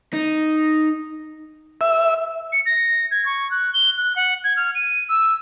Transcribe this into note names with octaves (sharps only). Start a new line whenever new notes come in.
D#4
E5
C#7
A#6
G#6
C#6
F#6
G7
F#6
F#5
G#6
F6
D#7
E6